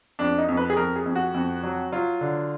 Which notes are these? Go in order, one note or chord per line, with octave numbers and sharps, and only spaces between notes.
F2 D4
D#4
F2
B4
G#4
F2 A#4
G#4
F2
F#4
F2
F#3
F#3 F4
D3